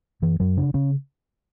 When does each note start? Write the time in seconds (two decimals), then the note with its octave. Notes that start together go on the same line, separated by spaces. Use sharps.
0.22 F#2 E3
0.40 F#2 F#3
0.57 C#3 D4
0.74 C#3 C#4